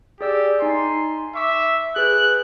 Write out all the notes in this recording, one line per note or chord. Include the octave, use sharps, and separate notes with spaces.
G4 G#4 D5 E6
D#4 G#5 C6
E5 C#6 D6 E6
G#4 B4 F#6 G6